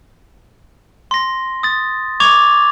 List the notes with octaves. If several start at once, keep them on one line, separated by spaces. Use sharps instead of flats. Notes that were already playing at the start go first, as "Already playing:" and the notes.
C6 A#6
D#6 A6
C#6 D6 G#6 F7